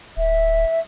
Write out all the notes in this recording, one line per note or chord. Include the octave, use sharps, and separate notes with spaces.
D1 E5